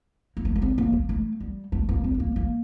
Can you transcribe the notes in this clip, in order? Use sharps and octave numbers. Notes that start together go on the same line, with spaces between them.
A#3
A3
A#3
C4
A#3
A#3
A3
G3
A3
A#3
C4
C4
A#3
A#3